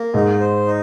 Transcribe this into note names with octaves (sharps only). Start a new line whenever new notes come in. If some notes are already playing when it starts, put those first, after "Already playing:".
Already playing: A#3
G#2 D#4
C5
D#4